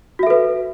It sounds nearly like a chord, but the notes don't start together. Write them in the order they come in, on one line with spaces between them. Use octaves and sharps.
F#4 E5 A4 B4